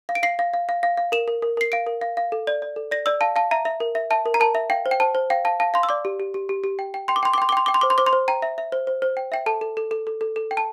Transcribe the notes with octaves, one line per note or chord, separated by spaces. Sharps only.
F5
D7
F5 C7
F5
F5
F5
F5
F5
A#4 E7
A#4
A#4
A#4 C7
F5 D7
A#4
F5
F5
A4
D5
D5
A4
D5 A#6
D5 E6
F5 A5
F5 A5
E5 A#5
E5
A#4
E5
E5 A5
A#4
A#5
A#4 A5
E5
F5 G5
C5
G5
C5 A5
C5
F5 G5
F5 A5
F5 A5
F5 C6
E6
D5 D6
G4
G4
G4
G4
G4
G5
G5
G5 C6
D6
G5 C6
D6
G5 C6
D6
G5 C6
G5 D6
C6
C5 D6
C6
C5 D6
C6
C5
G5 A#5
E5
E5
C5
C5
C5
G5
E5 G5
A4 A5
A4
A4
A4
A4
A4
A4
G5
A5